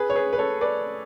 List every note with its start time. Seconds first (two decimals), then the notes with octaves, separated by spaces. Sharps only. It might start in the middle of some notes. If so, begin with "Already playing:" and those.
Already playing: G#4 B4
0.10 C#5
0.16 G#4 B4
0.33 B4
0.38 A4 C#5
0.61 B4 D5